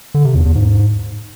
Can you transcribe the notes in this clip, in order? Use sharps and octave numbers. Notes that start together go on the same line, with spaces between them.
D3
C3
E2
E2
G#2